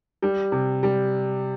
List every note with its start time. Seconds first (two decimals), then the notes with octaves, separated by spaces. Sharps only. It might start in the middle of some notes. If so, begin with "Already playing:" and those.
0.22 G3
0.52 C3
0.83 G3